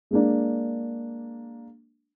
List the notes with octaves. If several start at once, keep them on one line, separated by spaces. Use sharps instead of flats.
G#3 A#3 D4